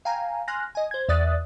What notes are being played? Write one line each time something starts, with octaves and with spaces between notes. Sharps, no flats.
F5 G5 G#5 A#5
G#5 C6 F6 F#6 A#6
D#5 G#5
C5 G#6
E2 D5 E5 D#6 F#6 A6